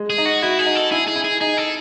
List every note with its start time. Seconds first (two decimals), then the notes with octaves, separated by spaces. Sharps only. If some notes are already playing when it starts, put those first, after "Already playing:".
Already playing: G#3
0.10 G#4
0.18 D#4
0.25 F#4
0.42 E4 F#4
0.59 G#4
0.66 D#4
0.75 A4
0.92 E4 G#4
1.08 G#4
1.16 E4
1.24 G#4
1.41 D#4 G#4
1.58 A4